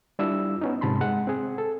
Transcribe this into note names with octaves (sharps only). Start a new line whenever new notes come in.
G3 D4 E4 F4 E6
B3 C#4 D#4
G#2 C3 A5 B5 C6
G#3 F#5
C4 G#4
A4